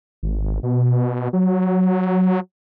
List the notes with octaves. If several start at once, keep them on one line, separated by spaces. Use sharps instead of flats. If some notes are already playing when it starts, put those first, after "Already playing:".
G#1
B2
F#3